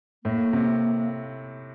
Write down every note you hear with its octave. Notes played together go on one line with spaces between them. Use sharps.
A2 A#3
C3